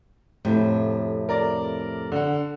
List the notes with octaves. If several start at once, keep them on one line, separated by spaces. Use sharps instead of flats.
F2 A2 C3
A#4 D5
D3 F#5